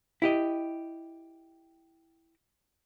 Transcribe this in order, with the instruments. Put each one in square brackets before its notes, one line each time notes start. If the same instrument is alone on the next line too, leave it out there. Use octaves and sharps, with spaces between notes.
[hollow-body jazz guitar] E4 G4 D#5